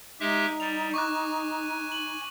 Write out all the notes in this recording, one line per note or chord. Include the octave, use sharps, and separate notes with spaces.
G#3 D#4 G4 E5
G3 F7
G#5 C#6 D6 F#6
F#7